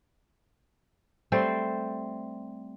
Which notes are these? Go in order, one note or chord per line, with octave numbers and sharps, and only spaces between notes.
G3 A3 C4 C5